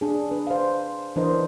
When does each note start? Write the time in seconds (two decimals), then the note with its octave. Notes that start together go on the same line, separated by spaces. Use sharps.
0.01 D4 G#4
0.31 D4 B4
0.47 C5 F5
1.16 E3 D4 A#4 C5 D#5